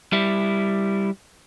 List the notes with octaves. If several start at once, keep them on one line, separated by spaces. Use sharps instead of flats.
G3 E4